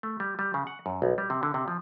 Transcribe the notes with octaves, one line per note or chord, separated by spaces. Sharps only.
A3
G3
G3
C#3
F#5
F#2
B1
G3
C3
D3
C3
F3